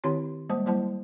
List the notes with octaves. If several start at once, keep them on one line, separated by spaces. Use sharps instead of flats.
D#3 C4 E4 G4 C#5 C6
G3 G#3 A#3 C5 A5
F#3 G3 A#3 E4 C5 A5